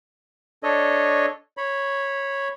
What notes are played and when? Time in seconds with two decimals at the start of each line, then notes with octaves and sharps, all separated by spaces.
0.63 D4 A4 C#5 D#5
1.57 C#5 B5